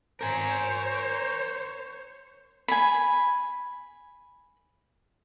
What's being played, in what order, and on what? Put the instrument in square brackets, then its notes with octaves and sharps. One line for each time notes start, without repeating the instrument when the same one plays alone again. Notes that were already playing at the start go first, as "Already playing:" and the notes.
[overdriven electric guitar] A#4 G#5 [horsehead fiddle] C5 C#5
[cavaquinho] G#5 B5